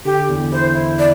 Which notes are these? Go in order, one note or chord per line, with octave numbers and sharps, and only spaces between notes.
D3 G4
E2
E4 C5
E4
D5